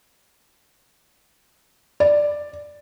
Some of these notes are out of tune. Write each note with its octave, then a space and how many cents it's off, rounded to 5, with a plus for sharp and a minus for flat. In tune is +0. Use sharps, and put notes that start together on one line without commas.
D5 +5